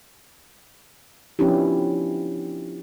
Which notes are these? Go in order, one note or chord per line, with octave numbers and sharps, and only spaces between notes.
F3 B3 C#4 D4 E4 G4